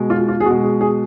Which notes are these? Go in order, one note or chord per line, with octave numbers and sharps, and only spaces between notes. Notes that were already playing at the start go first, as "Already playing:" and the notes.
Already playing: B2 G#3
F4
F4
G#4
B2 G#3 F#4
G#4
G#4